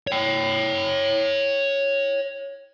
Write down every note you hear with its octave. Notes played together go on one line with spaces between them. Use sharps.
C#5 G5